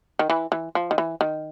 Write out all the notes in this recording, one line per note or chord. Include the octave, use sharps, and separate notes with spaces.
D#3
E3
E3
F3
D#3
E3
D#3